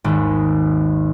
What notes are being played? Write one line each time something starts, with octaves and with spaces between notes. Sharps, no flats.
G#1 D#2